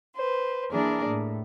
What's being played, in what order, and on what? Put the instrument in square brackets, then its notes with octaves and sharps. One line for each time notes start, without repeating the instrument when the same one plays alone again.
[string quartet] B4 C5
E3 A#3 D4 G#4 A#4 D5
A2